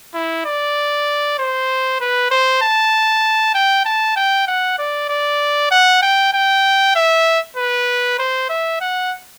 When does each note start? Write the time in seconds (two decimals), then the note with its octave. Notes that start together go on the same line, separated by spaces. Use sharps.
0.14 E4
0.45 D5
1.39 C5
2.01 B4
2.31 C5
2.62 A5
3.55 G5
3.85 A5
4.16 G5
4.48 F#5
4.79 D5
5.09 D5
5.71 F#5
6.02 G5
6.33 G5
6.96 E5
7.57 B4
8.19 C5
8.49 E5
8.81 F#5